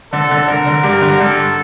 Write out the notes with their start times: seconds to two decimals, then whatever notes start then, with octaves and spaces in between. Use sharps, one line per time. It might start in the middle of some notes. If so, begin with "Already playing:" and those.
0.12 D3 A4
0.31 D3
0.48 D3 A#4
0.67 D3
0.83 G2
1.02 D3
1.20 G2 A4